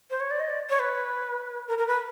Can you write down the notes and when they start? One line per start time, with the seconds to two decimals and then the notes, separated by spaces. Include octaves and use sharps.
0.10 C5
0.20 C#5
0.30 D5
0.40 D#5
0.49 D5
0.69 C#5
0.79 B4
1.68 A#4
1.78 A#4
1.87 B4